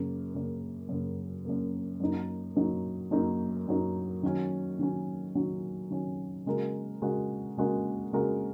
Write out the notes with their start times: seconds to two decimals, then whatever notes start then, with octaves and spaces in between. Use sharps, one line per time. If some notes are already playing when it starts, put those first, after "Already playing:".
Already playing: F#2 C#3 A#3
0.34 F#2 C#3 A#3
0.89 F#2 C#3 A#3
1.45 F#2 C#3 A#3
2.00 F#2 F#3 A#3 D#4
2.56 F#2 F#3 A#3 D#4
3.11 F#2 F#3 A#3 D#4
3.67 F#2 F#3 A#3 D#4
4.23 D#3 F#3 C#4
4.79 D#3 F#3 C#4
5.34 D#3 F#3 C#4
5.90 D#3 F#3 C#4
6.46 C#3 G#3 F#4 A#4
7.02 C#3 G#3 F#4 A#4
7.57 C#3 G#3 F#4 A#4
8.13 C#3 G#3 F#4 A#4